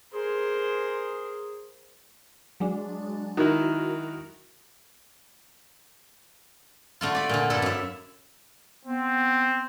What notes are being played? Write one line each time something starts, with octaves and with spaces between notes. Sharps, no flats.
G#4 A#4 C5
F#3 G#3 D4
D#3 E4 F#4 A#4
D3 A3 F4
D5 B5
A#2 D3
G2 E4 A4
F#2 E5
B3 C4